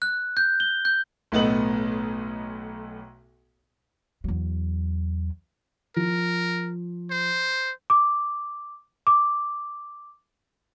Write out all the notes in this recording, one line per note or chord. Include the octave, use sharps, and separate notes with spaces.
F#6
G6
G7
G6
B1 A2 A3 B3 D#5 F#7
E2 F#3
F3 A#4
C5
D6
D6